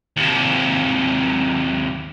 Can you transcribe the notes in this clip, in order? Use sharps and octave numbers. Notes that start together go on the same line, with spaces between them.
D#2 C3